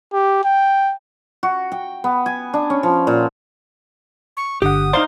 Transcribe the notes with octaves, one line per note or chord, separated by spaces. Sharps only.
G4
G5
F#4
G5
B3
G#5
D4
C#4
F3
A#2
C#6
G1 D3 G4 F#5 D#6
D#4 C5 D5 F5 A#5 C6